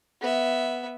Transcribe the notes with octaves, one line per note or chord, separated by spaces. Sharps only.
B3 E5